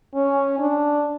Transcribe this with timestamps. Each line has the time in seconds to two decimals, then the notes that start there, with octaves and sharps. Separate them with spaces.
0.14 C#4
0.59 D4